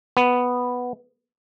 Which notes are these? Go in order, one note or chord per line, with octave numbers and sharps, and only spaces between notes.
B3